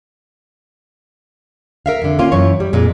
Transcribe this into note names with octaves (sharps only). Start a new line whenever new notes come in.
A#4 E5 F5
F2 D3
A#3 C#4 F4
F#2 E3 C#5
G3
F2 A#2 G#3